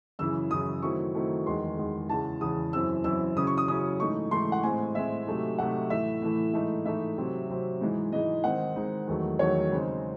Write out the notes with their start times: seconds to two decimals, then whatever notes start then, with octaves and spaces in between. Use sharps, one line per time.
0.19 F#2 C#3 E3 E6
0.51 F#2 C#3 E3 D#6
0.82 D#3 F#3 A3 C4 E4 C#6
1.15 D#3 F#3 A3 C4 E4
1.46 E2 D#3 G#3 C6
1.78 E2 D#3 G#3
2.09 E2 C#3 E3 A5
2.41 E2 C#3 E3 D#6
2.73 F#2 E3 C4 E4 E6
3.04 F#2 E3 C4 E4 E6
3.36 C#3 F#3 C#4 E4 D#6
3.47 C#6
3.58 D#6
3.68 C#3 F#3 C#4 E4 D#6
4.00 G#2 E3 A3 D#4 C#6
4.31 G#2 E3 A3 D#4 C6
4.52 F#5
4.63 A2 G#3 C4 G#5
4.95 A2 G#3 C4 E5
5.27 C3 F#3 A3 D#4
5.59 C3 F#3 A3 D#4 F#5
5.90 A2 E3 A3 E5
6.22 A2 E3 A3
6.54 G#2 E3 A3 D#4
6.85 G#2 E3 A3 D#4 E5
7.18 C3 F#3 C4
7.49 C3 F#3 C4
7.81 G#2 E3 G#3 D#4
8.12 G#2 E3 G#3 D#4 D#5
8.44 D#3 G#3 C4 D#4 F#5
8.76 D#3 G#3 C4 D#4
9.07 E2 D#3 F#3 A3
9.39 E2 D#3 F#3 A3 C#5
9.71 C#3 G#3 C4 D#4